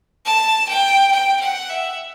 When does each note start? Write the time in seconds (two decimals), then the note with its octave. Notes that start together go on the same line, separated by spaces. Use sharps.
0.26 A5
0.69 G5
1.12 G5
1.41 F#5
1.70 E5